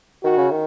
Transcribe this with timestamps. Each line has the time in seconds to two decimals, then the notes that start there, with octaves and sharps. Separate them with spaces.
0.23 D#3 F#4
0.37 C#3
0.51 D#3